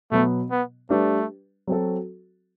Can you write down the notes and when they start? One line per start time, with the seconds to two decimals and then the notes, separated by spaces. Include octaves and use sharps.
0.11 B2 F#3 A3 B3
0.51 B3
0.90 G3 A3 D4 G4 B4
1.67 F#3 C4 F#4 A4